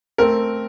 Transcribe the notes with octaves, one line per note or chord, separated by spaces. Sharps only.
A3 C4 A#4